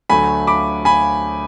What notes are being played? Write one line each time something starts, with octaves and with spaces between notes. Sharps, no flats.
D2 D3 F#3 A3 G#5 B5
B5 D6
G#5 B5